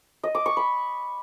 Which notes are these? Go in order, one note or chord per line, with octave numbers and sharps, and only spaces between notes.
D#5
D6
C#6
B5